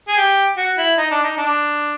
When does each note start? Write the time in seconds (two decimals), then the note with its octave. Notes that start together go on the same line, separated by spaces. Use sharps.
0.08 G#4
0.17 G4
0.57 F#4
0.78 E4
0.98 D#4
1.11 D4
1.24 D#4
1.37 D4